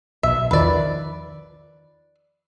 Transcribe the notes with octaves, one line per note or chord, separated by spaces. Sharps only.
B1 E5
E2 D#3 F3 B4 D5